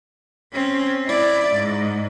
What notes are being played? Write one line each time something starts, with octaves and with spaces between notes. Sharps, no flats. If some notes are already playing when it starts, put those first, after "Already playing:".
C4 C#4
E4 D5
G#2